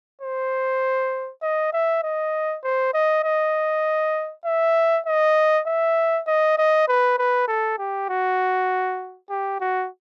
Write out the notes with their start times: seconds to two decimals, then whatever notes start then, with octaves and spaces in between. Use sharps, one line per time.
0.21 C5
1.42 D#5
1.73 E5
2.03 D#5
2.63 C5
2.94 D#5
3.24 D#5
4.45 E5
5.06 D#5
5.67 E5
6.27 D#5
6.58 D#5
6.88 B4
7.18 B4
7.48 A4
7.78 G4
8.09 F#4
9.30 G4
9.60 F#4